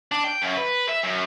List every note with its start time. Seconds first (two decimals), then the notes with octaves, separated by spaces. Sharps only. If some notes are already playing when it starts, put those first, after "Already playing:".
0.12 D4
0.25 G5
0.42 F#2
0.57 B4
0.89 E5
1.04 F#2